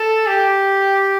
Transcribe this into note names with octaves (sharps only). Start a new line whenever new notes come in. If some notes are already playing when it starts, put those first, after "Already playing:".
Already playing: A4
G4